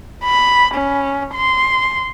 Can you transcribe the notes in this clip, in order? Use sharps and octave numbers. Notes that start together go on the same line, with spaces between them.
B5
C#4
C6